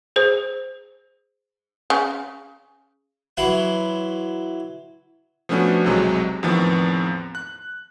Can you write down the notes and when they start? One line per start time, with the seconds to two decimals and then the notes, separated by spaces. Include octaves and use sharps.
0.16 G#4 C5
1.90 C#3
3.37 E3 F#3 F#5 B5 C6
5.49 F3 A3 B3 C#4 D4 F#4
5.85 B1 E2 C3 F#3 G#3
6.43 E2 A2 D#3 F3 B3 C4
7.35 F#6